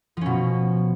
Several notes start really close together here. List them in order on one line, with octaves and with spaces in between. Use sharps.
F3 C#4 B2